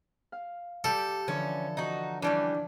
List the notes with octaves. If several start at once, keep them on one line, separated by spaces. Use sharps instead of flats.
F5
G3 G4 A4
D3 E3 F3 C#4
D#4 F#4
E3 G3 C#4 D4